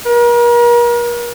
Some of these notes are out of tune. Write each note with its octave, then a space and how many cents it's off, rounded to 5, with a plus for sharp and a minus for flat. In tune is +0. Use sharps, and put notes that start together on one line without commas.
A#4 +40